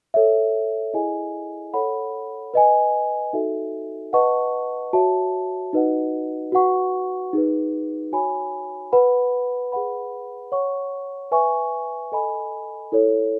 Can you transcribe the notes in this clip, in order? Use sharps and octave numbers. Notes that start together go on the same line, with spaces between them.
A4 C#5 E5
E4 G#4 D#5 G#5
A4 C#5 F#5 B5
B4 D#5 G#5
D#4 F#4 A4 E5
B4 D#5 F#5 A5 C#6
F#4 C#5 E5 A5
D#4 F#4 B4 D#5 F#5
F#4 B4 F#5 C#6
D#4 G#4 B4
F#4 C#5 G#5 B5
B4 F#5 B5
G#4 B4 F#5 B5
C#5 F#5 C#6
B4 E5 G#5 C#6
A4 D#5 G#5 B5
E4 A4 C#5